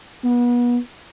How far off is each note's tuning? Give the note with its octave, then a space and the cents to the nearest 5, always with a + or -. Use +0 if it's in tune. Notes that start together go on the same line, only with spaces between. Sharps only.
B3 -30